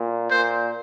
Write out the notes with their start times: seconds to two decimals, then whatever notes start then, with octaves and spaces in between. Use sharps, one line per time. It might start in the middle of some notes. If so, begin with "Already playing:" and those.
Already playing: A#2
0.30 A#2 C5